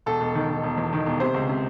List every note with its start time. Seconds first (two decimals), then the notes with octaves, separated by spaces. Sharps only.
0.06 E1 A4
0.21 E1
0.35 D#3
0.50 D#3
0.64 E1
0.77 E2
0.93 D#3
1.06 E1
1.20 C3 C5
1.34 C#2
1.49 C3